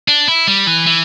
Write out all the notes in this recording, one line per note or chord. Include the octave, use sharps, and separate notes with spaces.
D4
E4
G3
E3
E3